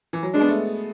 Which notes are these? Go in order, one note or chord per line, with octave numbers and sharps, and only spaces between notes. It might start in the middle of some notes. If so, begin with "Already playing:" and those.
E3
F#3
G#3 D4
B3
A3